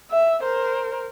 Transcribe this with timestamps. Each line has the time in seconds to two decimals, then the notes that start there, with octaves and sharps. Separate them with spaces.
0.11 E5
0.43 A#4 C5